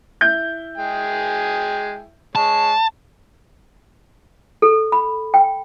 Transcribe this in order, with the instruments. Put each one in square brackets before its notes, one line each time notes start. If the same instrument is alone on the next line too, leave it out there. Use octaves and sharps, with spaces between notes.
[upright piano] E4 G6
[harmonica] G#3 G#4 G5
[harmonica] G#3 C#5 [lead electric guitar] A5
[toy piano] A4
B5
G5